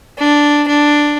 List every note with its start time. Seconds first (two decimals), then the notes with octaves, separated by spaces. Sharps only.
0.18 D4
0.67 D4